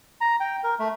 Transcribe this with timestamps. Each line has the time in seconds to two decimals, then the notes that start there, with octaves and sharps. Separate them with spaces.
0.21 A#5
0.40 G5
0.64 A#4
0.79 A3